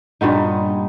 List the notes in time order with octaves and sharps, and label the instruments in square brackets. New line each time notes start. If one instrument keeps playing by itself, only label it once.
[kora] G2 A#2 B3 D#4